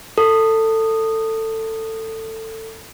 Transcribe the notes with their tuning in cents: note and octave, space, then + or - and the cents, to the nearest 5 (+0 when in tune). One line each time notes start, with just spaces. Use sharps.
A4 +20